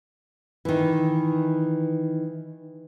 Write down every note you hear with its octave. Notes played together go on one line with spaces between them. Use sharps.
D#3 E3